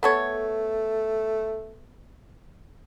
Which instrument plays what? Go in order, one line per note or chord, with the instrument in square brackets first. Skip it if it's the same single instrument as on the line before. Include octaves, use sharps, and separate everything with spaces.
[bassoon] A3 [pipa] B3 A4 C#5